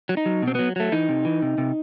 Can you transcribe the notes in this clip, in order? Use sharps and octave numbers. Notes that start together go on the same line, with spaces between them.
F#3
D#4
F#3
B2 C4
F#3 B3
F#3 A3
E3 D#4
C3
E3
C3
C3